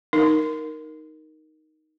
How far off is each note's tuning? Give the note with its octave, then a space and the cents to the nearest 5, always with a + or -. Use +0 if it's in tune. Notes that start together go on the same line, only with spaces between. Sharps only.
D#4 +0 A#4 +0